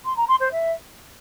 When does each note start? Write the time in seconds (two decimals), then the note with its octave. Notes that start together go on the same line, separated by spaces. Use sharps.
0.05 C6
0.16 A#5
0.28 C6
0.40 C5
0.51 E5